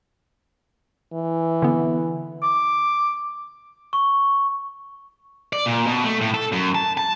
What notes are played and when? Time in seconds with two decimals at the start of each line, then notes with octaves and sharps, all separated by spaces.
1.13 E3
1.62 D3 B3
2.43 D6
3.93 C#6
5.53 D5
5.66 A#2
5.87 B2
6.04 A3
6.21 A2
6.34 A4
6.52 F#2
6.75 A5
6.97 A5